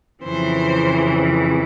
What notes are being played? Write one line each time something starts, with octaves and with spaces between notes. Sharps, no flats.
F2 C#3 E3 C5